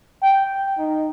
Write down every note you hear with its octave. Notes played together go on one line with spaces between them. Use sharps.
G5
D#4